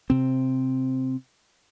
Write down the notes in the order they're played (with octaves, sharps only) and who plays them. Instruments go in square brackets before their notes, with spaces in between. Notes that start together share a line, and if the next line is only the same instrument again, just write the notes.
[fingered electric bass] C3 C4